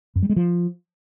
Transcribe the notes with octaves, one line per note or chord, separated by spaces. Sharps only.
F#2
G3
G#3
F3